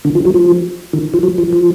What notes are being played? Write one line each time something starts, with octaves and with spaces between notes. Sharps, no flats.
D3
F3
F#3
F3
D#3
F3
F#3
F3
F3